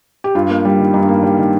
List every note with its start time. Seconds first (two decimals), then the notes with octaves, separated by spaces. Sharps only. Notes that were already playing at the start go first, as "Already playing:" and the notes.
0.24 G4
0.35 G2 F4
0.50 A#3
0.65 G3
0.79 D#3
0.94 G2 D#4
1.08 A#3
1.23 G3
1.38 D#3